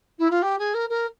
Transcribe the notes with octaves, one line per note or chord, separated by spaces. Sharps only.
E4
F4
G4
G#4
A#4
A#4